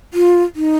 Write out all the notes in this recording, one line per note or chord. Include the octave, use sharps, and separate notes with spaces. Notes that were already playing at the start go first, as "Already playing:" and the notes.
F4
D#4